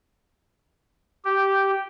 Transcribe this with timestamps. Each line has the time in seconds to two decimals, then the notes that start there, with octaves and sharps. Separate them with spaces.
1.25 G4